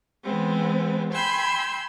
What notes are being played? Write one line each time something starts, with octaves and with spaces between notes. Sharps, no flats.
E3 G#3 B3 C4
G5 G#5 B5 C6 E6 G6